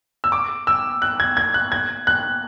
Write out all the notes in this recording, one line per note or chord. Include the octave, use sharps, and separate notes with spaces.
E6
D6
E6
F#6
G#6
G#6
F#6
G#6
F#6